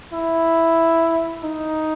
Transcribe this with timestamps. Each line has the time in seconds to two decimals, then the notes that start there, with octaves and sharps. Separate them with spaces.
0.13 E4
1.44 D#4